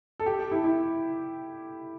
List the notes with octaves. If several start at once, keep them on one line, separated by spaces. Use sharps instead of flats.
A4
G4
G4
E4
E4